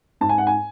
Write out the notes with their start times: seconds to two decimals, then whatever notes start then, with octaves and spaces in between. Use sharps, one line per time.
0.21 G#2 A5
0.29 G#5
0.38 F#5
0.47 G#5